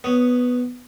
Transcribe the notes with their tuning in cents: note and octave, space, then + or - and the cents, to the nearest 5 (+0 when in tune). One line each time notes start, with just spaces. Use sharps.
B3 +0 C#5 +0 D#6 +0